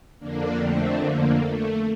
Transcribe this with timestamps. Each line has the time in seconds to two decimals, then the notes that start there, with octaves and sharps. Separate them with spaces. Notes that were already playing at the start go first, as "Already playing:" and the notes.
0.19 F2 D3 A#3 D4
0.59 A3 C4
1.00 A#3
1.40 A3